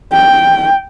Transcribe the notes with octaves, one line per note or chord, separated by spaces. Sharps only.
G5